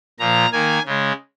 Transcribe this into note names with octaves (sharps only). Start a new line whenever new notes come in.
A#2 F3 A#3 A#5
D#3 A#3 G#5
C#3 G#3